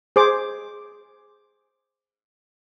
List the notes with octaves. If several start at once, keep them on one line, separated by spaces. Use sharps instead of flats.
G#4 C5 D6